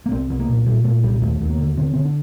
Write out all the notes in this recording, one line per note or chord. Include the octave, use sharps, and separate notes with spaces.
A#3
C2 C4
C2
A#3
A#2
A#2 G3
A#2 A3
C2 G3
D#2 A3
D#2
A#3
D3
D3 C4
D3 C4
D4